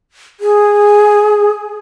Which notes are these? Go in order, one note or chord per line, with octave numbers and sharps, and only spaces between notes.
G#4